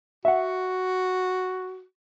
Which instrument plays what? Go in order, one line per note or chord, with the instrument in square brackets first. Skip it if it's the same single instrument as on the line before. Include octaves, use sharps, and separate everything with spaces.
[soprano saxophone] F#4 [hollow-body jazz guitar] E5 F#5